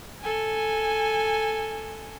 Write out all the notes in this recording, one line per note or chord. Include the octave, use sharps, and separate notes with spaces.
A4 G#5